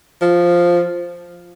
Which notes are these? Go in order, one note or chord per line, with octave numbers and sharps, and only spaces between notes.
F3